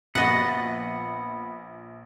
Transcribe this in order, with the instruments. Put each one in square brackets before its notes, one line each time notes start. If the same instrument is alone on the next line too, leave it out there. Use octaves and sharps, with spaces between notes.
[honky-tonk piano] A#1 A6 [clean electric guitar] B3 [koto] F#4 D#5 F#5